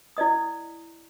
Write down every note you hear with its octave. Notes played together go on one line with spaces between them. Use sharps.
E4 D5 D#5 D#6